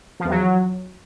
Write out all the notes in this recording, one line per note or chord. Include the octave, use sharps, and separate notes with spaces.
F3
E2
F#3